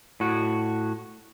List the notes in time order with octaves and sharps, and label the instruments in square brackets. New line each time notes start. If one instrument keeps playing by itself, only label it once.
[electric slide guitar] A2 F#4